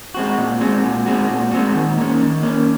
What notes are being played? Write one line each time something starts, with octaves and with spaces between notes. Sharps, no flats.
G#3 C4 F#4
A#2
G#3 C4 F#4
A#2
G#3 C4 F#4
A#2
G#3 C4 F#4
D#3
A#3 C#4
D#3
A#3 C#4